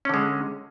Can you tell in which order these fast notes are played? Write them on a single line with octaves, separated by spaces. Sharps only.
C#4 D3 G#3